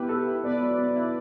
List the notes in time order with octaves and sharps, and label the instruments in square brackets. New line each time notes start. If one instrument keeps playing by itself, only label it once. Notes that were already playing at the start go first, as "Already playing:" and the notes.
Already playing: [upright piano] B3 E4 [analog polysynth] G4 B4
[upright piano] A4
E4
[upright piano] B3 [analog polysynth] B4 D5
[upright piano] F#3
B3
E4